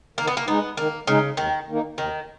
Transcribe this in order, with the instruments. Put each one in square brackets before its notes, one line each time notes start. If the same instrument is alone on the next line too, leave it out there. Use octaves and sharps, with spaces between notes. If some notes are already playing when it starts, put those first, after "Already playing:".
[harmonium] D#3 [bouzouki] A#3
[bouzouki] B3
A#3
[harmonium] G#3 D#4 [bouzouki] B3
[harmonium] D#3 [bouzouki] A#3
[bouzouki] C#3 [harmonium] G#3 D#4
[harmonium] D#2 [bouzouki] D#3
[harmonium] D#3 A#3 D#4
[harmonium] D#2 [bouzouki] D#3